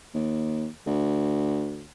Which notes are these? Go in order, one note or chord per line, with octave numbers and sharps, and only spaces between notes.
D#2
D2